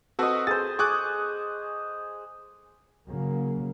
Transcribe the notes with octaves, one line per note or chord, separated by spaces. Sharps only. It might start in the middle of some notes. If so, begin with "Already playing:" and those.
C4 F#4 A4 B4 D#5
G#4 C5 A6
G#4 C#6 D6 F#6
C#3 F#3 A#3